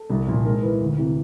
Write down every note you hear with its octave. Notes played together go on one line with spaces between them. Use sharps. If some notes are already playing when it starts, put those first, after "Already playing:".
Already playing: A4
C2
A#2 F3
G#2 A#4
E3 B4
D2
C3 E3